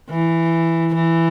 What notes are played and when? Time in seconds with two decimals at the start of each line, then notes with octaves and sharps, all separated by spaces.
0.10 E3
0.94 E3